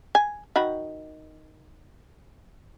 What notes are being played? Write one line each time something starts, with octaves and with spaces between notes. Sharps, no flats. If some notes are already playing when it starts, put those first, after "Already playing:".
G#5
D#3 F#4 B5